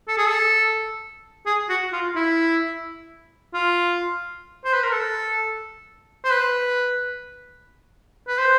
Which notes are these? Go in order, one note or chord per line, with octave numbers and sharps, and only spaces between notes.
A4
G#4
A4
G#4
F#4
F4
E4
F4
C5
B4
A#4
A4
C5
B4
B4
C5